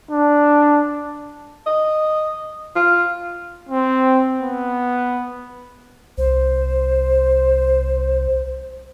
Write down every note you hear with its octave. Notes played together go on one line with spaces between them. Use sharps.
D4
D#5
F4
C4
B3
C2 C5